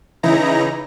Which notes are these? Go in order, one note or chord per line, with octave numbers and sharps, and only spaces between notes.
C#3 E3 D#4 E4 A#5 A#6